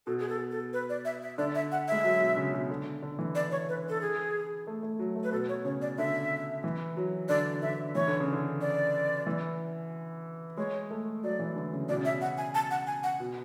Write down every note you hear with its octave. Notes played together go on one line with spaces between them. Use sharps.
B2 A4
G#4
A4
A4
B4
D5
E5
E5
D3 D5
E5
F#5
G#3 E5
F#3
B2
C#3
B2
D3
D3
E3
D5
C#5
B4
A4
G#4
A3
A3
F#3
A3
B4
B2 A4
C#5
C#3 C#5
D5
D3 E5
E3
F#3
D3 D5
D3 E5
E3 C#5
D3
C#3
D3
D5
E3
G#3 C#5
A3
F#3 D5
E3
D3
C#3
B2 D5
C#3
B2 E5
F#5
G#5
A5
F#5
G#5
F#5
B2